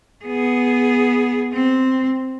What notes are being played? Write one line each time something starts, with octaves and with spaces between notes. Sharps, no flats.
B3 G#4
C4